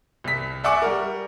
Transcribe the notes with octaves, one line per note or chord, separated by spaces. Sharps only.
C2 B6
D5 E5 F#5 G#5 C#6 D6
G3 A#4